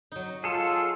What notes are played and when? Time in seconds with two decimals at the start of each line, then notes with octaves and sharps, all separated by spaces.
0.12 F#3 D#4
0.44 F4 G#4 A4